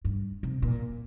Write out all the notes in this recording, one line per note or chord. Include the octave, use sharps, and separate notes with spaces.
G2
C3
A#2